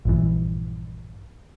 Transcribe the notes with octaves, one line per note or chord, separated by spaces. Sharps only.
A#1 G2 E3